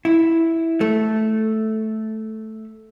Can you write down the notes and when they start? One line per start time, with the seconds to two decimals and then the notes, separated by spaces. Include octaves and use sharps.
0.05 E4
0.81 A3